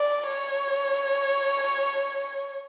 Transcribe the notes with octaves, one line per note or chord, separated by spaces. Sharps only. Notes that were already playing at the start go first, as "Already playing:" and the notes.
Already playing: D5
C#5